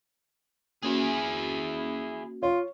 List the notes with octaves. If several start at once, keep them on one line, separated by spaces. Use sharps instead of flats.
A#3 C#4 E4 F#4 G#4
F4 C#5